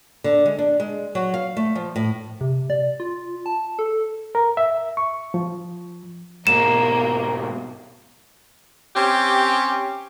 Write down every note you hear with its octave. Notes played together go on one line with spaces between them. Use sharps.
D3
G#3
D4
G#3
F#3
F5
A3
F3
A2
C3
D5
F4
A5
A4
A#4
E5
C#6
F3
G#2 B2 A#3 E7
C4 C#4 G4